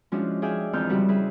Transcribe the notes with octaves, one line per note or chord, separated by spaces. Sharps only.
F3 G#3 C#4 D4 E4 F#4
G#4 D5 E5 F5 G5 G#5
F2 G#2 E3 C4 F6 G6
C#3 G3 F#4 B4
C#4 E4 G#4 B4 E5